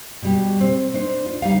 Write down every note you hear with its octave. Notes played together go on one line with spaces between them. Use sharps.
B2 G3 G4
C4
D4 D#4 C5
F4
G3 D#4 F5